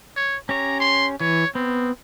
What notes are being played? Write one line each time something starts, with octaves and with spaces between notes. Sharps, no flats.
C#5
C#4 G4 C#5 A#5
C6
E3 C#5
B3 C4